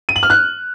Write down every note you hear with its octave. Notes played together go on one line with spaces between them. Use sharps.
D#7
F#7
F6
F#6